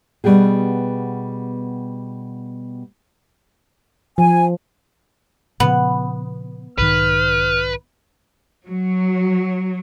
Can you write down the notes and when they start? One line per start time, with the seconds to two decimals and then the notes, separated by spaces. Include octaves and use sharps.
0.24 B2 G3 B3 G4 G#4
4.18 F3 G#5
5.60 A#2 C#3 F3 B3
6.78 B1 G#2 D#3 B4 F6
8.67 F#3